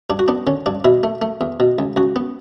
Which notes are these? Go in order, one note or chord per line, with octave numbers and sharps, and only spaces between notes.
G2 D4
F#4
B3 D4
D3 C#4
G2 D4
B2 E4
A3
A3
E2
B2
C#2
C#2 F#4
B3